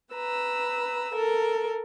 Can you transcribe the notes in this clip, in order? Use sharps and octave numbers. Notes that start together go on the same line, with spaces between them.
B4 A#5 E6
A4 A#4